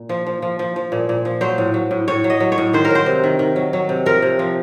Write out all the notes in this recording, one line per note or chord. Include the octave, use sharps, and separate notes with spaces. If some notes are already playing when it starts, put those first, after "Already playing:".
Already playing: A#2
F3
F3
F3
F3
F3
A#2
A#2
F3
F#3 C5
A2
F#3
A2
A2 C#5
F#3
D#5
F#3
C#5
A2
D#3 C5
A#4
F#3 C5
C3
D#3
D#3
F#3
F#3
C3
F3 A#4
C3
F3